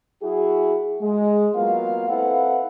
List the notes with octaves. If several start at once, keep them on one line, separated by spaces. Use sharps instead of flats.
F#3 E4 F#4 G#4
G#3
F#3 A#3 B3 F4 F5
C4 E4 A4 B4 F5 F#5